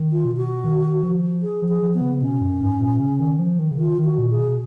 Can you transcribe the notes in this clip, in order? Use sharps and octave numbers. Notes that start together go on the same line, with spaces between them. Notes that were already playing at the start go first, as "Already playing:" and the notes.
Already playing: D#3
F4
B2
F#4
D#3
F3
G#4
F3
G#4
F3
B3
C#3
B2 C#4
F#2
G#2
A#2
C#3
D#3
F3
D#3
C#3
D#3 F4
D#3
F#4
A#2
G#4
B2